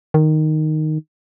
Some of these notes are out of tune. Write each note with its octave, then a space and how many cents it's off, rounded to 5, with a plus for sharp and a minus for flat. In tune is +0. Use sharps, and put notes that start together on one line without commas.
D#3 -5